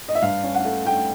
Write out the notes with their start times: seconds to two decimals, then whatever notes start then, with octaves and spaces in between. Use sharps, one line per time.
0.08 D#5
0.15 E5
0.22 G2 F5
0.43 C#4
0.55 F#5
0.65 A3
0.86 A3 G5